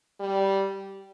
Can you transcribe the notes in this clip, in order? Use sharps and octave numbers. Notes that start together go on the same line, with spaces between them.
G3